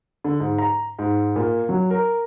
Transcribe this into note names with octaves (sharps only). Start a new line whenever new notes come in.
D3
G#2
A#5
G#2
A#2
F#3
A#4